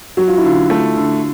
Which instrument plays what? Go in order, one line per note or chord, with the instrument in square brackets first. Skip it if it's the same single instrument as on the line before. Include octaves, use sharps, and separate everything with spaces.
[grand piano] F#3 [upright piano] F#4
[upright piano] F4
E4
[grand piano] D3 [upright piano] F4
[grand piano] A3
D3